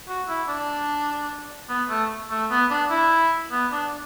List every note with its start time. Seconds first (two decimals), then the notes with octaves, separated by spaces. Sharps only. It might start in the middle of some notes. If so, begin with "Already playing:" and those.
0.08 F#4
0.28 E4
0.48 D4
1.69 B3
1.89 A3
2.30 A3
2.51 B3
2.70 D4
2.90 E4
3.52 B3
3.72 D4